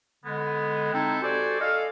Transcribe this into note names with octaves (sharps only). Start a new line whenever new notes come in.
D3 G#3 B3
G#3 C4 D#4 E4 A4 G5
F#4 G4 A4 C5 D5 G#5
A4 D5 D#5 F5